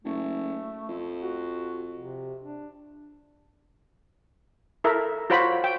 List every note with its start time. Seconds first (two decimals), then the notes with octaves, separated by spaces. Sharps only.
0.04 F#1 A3
0.89 F2
1.22 F#4
1.97 C3
2.41 D4
4.84 E4 A4 A#4 E5
5.30 F4 F#4 C5 C#5 B5
5.64 G5